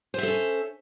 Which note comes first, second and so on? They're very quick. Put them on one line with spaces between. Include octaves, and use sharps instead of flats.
C5 E5 A4 C#4